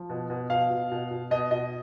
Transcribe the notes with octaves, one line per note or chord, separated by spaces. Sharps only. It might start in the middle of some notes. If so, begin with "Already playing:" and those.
Already playing: F3
B2
B2
B2 F5
B2
B2
B2
B2 D#5
B2 D#5